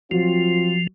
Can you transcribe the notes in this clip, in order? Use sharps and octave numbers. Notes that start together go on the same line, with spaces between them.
F3 F#3 C4 F4